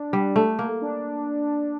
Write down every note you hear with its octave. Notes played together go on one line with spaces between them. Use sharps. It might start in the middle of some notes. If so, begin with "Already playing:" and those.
Already playing: D4
G3
A3
A#3
D4